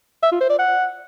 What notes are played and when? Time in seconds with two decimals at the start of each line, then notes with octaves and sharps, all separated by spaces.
0.23 E5
0.32 F4
0.41 C5
0.50 D5
0.59 F#5